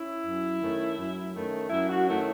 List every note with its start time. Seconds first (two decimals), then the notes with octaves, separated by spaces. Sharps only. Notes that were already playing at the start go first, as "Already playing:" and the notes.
Already playing: C#4 E4
0.25 F#2
0.61 D#3 A3 C#4
0.97 F#2
1.33 D#3 A3 C#4
1.70 F#2 E4
1.89 F#4
2.06 D#3 A3 C#4 E4